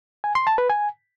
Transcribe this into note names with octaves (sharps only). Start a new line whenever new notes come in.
G#5
C6
A5
B4
G#5